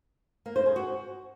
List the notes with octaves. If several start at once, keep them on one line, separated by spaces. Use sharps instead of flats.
A#3
C5
G#4
F#4